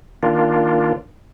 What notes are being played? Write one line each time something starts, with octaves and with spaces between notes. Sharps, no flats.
D#3 A#3 D4 F4